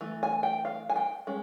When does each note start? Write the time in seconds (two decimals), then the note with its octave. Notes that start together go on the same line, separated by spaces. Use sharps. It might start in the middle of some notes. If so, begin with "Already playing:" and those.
0.01 E3 A3
0.23 G#5
0.43 G5
0.65 F5
0.89 G#5
0.96 G5
1.27 G#3 C#4